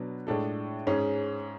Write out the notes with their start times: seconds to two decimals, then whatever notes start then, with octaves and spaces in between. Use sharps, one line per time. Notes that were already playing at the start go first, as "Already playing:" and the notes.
Already playing: B2 F#3 B3 D4
0.27 A2 G#3 D4 A4
0.87 G#2 G#3 C#4 G#4